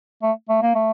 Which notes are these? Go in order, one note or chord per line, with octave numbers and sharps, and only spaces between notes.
A3
A3
A#3
A3